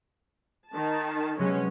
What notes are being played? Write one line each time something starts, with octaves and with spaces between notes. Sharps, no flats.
D#3 A5
C3 F#3 G#3 B3 C#4